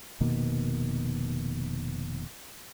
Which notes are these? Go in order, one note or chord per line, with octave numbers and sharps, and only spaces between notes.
F1 B2 D#3 A#3